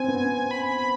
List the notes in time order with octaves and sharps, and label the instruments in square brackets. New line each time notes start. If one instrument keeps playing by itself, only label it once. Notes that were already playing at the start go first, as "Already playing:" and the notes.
Already playing: [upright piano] C4 [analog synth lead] G#5
[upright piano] B3
[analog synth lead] B5